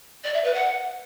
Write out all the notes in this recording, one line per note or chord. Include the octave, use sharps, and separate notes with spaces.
D5
E5
B4
F#5